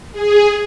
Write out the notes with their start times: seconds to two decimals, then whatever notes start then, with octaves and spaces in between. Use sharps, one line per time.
0.12 G#4